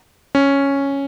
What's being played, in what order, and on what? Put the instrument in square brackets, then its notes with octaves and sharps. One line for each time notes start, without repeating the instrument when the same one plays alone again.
[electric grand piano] C#4